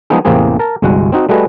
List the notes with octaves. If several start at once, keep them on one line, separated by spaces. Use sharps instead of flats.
F3 G#3 B3 D#4 G#4
A1 E2 C3 A#3 C4 G#4
A#4 A5
G1 C2 G#3 F#4 F#5
C4 D#4 F#4
G3 A3 F#4 G#4 B4 D#5